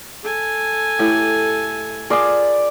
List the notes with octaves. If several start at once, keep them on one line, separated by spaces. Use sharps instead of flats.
A4 G#5
A2 G4
F4 G#4 A#4 D5